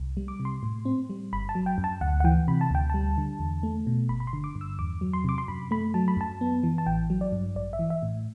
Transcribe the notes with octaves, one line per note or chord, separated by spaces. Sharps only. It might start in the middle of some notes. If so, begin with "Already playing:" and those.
Already playing: C2
G3
D6
C3
C6
A2
C4
G3
G1 B5
A5
F#3
G5
F#2
A5
D2 F#5
F#5
E3 G5
C3 B5
A5
D2 G5
G3 A5
D3
E2
A3
B2
G1 B5
B5
C6
D3
D6
G2
E6
E2 D6
F#3
C6
C3 D6
C6
F#2 B5
A3 B5
F#3 A5
B5
F#2 A5
B3
E3
A5
A1 G5
F#3
D5
G2
A1 D5
E5
E3
E5
A2